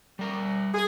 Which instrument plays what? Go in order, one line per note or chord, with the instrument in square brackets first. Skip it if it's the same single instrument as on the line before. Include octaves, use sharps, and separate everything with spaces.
[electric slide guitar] G3 A#4
[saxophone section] G#4